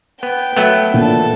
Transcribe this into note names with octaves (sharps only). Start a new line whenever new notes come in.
B3 G5
F#3 A3 B3
A#2 D4 A4